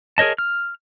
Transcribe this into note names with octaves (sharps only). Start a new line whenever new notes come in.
G#4 A#4 C#5 D#5 A5
F6